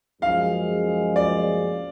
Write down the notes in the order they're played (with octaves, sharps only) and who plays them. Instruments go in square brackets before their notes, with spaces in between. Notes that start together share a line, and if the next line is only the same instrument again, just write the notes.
[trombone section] F#2 F3 G#3 C#4 G#4 [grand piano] F5
[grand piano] D5